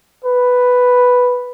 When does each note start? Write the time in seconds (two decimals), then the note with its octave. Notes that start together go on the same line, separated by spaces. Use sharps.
0.24 B4